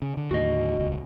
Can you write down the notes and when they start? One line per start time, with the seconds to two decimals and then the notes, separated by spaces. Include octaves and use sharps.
0.02 C#3
0.17 D3
0.31 D#2 A2 D3 F#4 D#5
0.77 D#1 C#2